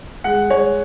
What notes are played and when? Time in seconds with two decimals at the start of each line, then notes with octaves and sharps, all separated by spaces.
0.24 G#3 F#5
0.50 G#3 C#5